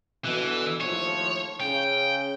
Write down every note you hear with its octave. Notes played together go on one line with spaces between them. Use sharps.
B2 D3 E3
D#2 A2 F3 C#5
C#3 G5